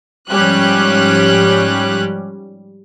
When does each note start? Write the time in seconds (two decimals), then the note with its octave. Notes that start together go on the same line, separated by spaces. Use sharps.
0.31 G#2 F3 G3 C#4 G4 F#6